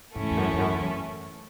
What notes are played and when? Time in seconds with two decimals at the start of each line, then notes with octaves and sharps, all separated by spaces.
0.15 G#2 E3 A3 C#4 E4 A4
0.30 E2
0.37 F#2
0.53 E2
0.58 F#2
0.80 E2